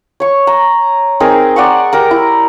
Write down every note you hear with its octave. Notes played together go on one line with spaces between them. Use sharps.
C#5 C#6
A#5
C4 D#4 G#4 A#4
D5 F#5 C6 C#6
G4 A#4 A#5
E4